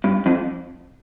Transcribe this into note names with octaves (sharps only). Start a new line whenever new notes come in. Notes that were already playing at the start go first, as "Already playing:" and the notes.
G2
F2